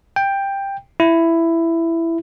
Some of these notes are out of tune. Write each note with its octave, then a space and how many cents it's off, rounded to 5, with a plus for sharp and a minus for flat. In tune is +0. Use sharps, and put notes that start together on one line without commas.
G5 +10
E4 +10